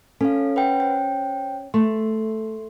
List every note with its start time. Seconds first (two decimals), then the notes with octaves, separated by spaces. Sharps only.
0.21 C#4 A4 F5
0.56 B4 F#5 G5
0.80 C5 G5
1.74 A3 C6